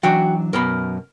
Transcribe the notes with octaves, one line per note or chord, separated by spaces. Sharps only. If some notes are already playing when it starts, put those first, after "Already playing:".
E3 F#3 D4 F#4 G5
F#2 B2 A#4 B5